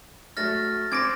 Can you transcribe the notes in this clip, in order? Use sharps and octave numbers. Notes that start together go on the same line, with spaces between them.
F#3 A3 F6 A6 A#6
C4 D6 G#6 A#6 D7